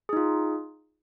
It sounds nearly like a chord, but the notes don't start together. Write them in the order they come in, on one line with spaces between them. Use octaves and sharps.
G#4 D#4 F4